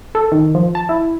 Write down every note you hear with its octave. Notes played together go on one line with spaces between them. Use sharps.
A4
D#3
F3
A5
E4